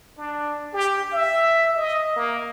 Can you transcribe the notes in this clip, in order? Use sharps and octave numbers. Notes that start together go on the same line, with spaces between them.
D4
G4
E5
D#5
A#3